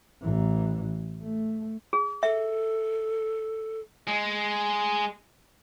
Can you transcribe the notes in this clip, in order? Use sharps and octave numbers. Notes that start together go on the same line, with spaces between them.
A1 E3
A3
G#4
A4 E5
G#3